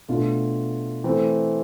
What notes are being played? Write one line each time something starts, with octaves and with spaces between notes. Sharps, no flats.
B2 A3 D4 F4
E3 A3 C4